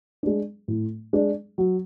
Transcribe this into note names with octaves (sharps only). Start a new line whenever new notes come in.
G#3 D4
A2
G#3 D4
F#3